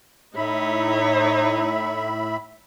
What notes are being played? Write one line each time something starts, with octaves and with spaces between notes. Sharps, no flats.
A2 D#4 C#5 E5 B5